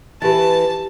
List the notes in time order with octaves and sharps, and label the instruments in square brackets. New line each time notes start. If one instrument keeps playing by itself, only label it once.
[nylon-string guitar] E3 B4 [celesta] G4 A6 [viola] A5